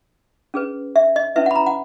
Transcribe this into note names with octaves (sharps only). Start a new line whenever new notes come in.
C#4 G#4 B4
E5
D#5
C#4 E4 B4 E5
F#5 B5
A#5
F#5